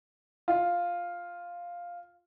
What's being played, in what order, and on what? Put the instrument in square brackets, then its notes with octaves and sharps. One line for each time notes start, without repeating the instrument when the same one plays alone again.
[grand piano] F4